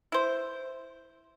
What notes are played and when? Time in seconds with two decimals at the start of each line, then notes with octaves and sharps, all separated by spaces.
0.12 E4 C5